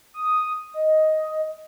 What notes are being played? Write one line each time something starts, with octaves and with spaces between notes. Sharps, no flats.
D#6
D#5